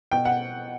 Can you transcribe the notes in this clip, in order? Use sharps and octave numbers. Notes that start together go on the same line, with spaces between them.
B2 G5
F#5